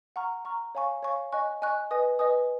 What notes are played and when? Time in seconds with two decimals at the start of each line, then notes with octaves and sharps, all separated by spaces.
0.16 F#5 A#5 C#6 F6
0.45 F#5 A#5 C#6 F6
0.75 C#5 F5 G#5 C#6
1.03 C#5 F5 G#5 C#6
1.32 D#5 G#5 C#6 F#6
1.62 D#5 G#5 C#6 F#6
1.91 B4 D#5 G#5 D#6
2.19 B4 D#5 G#5 D#6